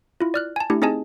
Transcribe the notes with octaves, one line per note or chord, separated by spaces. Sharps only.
E4 F4
D5 F6 F#6
G#5 A5
A3 D4 E4 G4
C4 D#4 G#4 D#5 G#5 A5